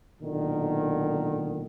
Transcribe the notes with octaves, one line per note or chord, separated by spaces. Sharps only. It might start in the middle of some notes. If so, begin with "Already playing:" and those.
B1 A#2 D3 D#3